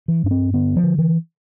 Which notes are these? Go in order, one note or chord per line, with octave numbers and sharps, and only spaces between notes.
E3
G2 D4
C4
D3 B3
F3
D3
E3